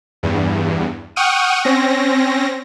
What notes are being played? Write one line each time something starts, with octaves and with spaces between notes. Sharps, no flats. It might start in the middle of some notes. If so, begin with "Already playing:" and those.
E2 G2
F#5 G5 C#6 D#6 F6 D#7
C4 C#4 A#6